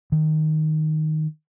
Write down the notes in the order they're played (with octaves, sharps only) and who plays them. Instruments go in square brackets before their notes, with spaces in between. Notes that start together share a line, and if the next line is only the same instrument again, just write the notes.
[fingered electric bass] D#3